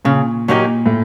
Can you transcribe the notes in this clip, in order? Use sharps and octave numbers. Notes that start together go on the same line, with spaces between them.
A#2 C#3
A#2 F#3 A#3 D#4 G4
A2